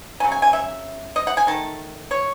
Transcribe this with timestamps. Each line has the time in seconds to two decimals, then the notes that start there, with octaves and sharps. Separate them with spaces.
0.20 C#3 F#3 A3 G#5
0.32 G#5
0.42 G#5
0.53 E5
1.16 D#5
1.27 F#5
1.37 G#5
1.47 D#3 A3 A5
2.11 C#5